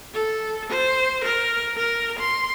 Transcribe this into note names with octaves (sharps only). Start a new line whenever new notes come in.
A4
C5
A#4
A#4
C6